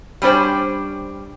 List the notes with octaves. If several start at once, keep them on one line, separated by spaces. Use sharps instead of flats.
G3 C#4 D4 C5 G5